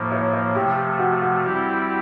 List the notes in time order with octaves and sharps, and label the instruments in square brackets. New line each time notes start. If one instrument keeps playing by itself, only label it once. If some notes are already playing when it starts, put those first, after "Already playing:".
Already playing: [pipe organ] A2 F3 A#3 [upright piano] C5
[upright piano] C#5
C#5
[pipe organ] C3 F3 A3 [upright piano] G4
[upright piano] F#4
F#4
[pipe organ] G3 C4 E4 G4